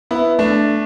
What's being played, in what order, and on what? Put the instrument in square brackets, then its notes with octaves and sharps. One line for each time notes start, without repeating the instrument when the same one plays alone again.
[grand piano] B3 E4
A3 D4